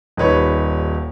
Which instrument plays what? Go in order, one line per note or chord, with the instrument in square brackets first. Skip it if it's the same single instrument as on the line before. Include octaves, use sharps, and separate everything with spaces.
[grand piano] D#1 D#4 B4 C#5